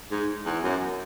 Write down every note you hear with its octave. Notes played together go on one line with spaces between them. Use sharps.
G#2
E2
F#2